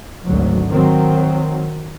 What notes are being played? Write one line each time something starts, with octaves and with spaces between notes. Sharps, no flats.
G#1 D2 F#3
D#3 F#3 C4